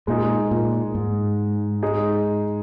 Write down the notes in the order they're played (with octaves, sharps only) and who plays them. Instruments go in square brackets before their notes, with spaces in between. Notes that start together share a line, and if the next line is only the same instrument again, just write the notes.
[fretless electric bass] A#2 [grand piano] G#3 D#4 G#4
[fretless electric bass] A#2
G#2
[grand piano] G#3 D#4 G#4